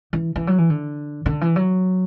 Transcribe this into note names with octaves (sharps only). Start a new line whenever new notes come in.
E3
E3
F#3
E3
D3
D3
E3
F#3